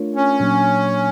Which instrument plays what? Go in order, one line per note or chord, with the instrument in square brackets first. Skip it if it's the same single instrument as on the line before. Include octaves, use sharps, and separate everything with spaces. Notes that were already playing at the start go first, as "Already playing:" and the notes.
Already playing: [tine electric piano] A3 D4 F4 A#4 C#5
[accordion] C#4
[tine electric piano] A#2 F#3 A#3 D4